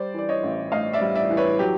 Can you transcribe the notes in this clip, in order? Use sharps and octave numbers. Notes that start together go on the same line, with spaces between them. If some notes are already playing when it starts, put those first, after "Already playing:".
Already playing: G3 C5 D5
E3 D5
C#5 D#5
A1
A2 D#5 F5
D5 E5
G3
D5 E5
E3
B4 C#5
F#3 G4